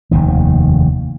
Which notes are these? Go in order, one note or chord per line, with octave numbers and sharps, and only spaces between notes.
F1 D#2 D#3